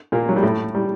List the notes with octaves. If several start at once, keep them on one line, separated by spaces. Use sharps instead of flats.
A#2 A#3
F#3
G3
A2 A3
G3